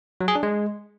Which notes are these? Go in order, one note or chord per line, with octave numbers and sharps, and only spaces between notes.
F#3
G#4
D4
G#3